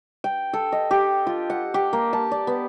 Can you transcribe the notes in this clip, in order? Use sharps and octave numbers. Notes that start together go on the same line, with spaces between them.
G5
A4
D#5
G4
F4
F#5
G4
A#3
A5
D5
B3